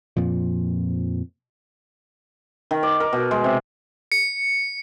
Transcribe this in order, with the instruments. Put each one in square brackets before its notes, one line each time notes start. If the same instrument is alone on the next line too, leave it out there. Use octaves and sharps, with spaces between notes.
[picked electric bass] F2 A#2 F3
[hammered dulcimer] D#3
D5
A#4
B2
G#3
C3
[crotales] C#7